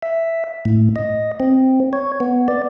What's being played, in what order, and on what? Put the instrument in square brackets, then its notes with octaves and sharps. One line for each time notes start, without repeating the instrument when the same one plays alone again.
[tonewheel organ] E5
A2
D#5
C4
C#5
B3
D5